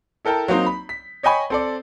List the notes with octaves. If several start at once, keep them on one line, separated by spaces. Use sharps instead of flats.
E4 A4 A#4 G5 A5
F#3 A#3 C4 D#4
B5
B6
C#5 D#5 G5 G#5 B5 C#6
C4 A4 D5